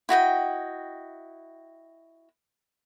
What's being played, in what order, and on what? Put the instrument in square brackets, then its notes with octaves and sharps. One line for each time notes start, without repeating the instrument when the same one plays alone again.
[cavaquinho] E4 F#4 D#5 G5